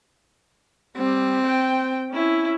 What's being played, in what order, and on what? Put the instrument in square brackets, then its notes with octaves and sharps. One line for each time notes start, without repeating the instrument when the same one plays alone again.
[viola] G3 [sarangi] C4
[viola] G5
C#4 E4